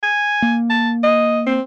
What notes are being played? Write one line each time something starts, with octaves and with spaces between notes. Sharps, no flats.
G#5
A#3
A5
D#5
C4